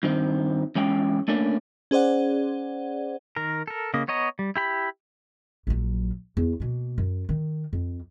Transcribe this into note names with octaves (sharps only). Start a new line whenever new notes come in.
G2 D#3 C4
E2 G#3 C#4 G5
A3 A#3 C#4 D4
C#4 G#4 C5 D5 F#5
D#3 A#4
A4 A#4
C#3 A#3 D#5
B3 C#5 D#5 A#5
G3
E4 G4 B5
A#1 F#3
E2
B2 A#3
F#2
D#3
F2